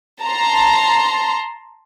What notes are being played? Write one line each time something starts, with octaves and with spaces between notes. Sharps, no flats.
A5 A#5 C6